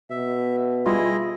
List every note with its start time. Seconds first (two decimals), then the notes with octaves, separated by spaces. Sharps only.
0.10 B2 E5
0.86 G3 E4 F4 G#4 D#5